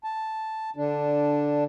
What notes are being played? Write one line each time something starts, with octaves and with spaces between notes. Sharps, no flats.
A5
D3 D4